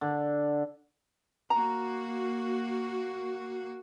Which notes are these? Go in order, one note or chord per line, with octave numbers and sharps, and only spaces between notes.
D3
A#3 F#4 A#5